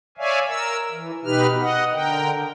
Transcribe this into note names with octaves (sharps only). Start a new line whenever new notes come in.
C#5 D5 E5 F5 G#5
A#4 E6
E3
B2 D#4 G4 B4 F6
D#5 F#5
D3 A#4 G5